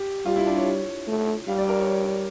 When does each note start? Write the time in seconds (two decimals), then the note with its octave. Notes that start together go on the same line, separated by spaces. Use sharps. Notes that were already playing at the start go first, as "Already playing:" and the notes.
Already playing: G4
0.26 G3 F4
0.36 E4
0.46 D4
0.57 C#5
1.08 A3
1.48 G3 F5
1.58 D5
1.69 A#4
1.79 C#5